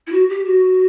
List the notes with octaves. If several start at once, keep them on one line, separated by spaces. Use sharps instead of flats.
E4
F#4
G4
F#4